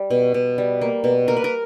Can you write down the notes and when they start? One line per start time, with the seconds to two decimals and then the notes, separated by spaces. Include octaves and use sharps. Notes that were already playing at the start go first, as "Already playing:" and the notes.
Already playing: G3
0.10 B2
0.34 B2
0.58 G3
0.81 A#3
1.04 B2
1.28 A#3 A#4
1.37 B4
1.44 A#4